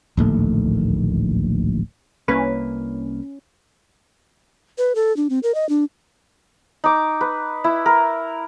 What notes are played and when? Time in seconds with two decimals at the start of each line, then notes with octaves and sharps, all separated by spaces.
0.17 D1 A#1 D#2 A3
2.28 C2 A#3 C#4 E4 A#4 B4
4.78 B4
4.95 A4
5.17 D4
5.30 C4
5.43 A#4
5.55 D#5
5.69 D4
6.84 D#4 D6
7.21 B4
7.64 E4
7.86 A#4